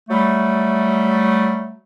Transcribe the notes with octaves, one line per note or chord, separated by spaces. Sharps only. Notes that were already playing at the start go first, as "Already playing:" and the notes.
F#3 G3 A3